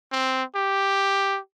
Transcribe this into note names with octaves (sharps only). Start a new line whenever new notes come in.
C4
G4